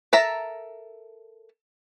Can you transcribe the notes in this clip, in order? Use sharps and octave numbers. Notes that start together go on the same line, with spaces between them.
A4 A#4 E5 A5 A#5